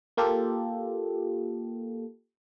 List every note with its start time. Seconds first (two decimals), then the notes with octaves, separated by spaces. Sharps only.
0.17 A#3 F4 G4 A4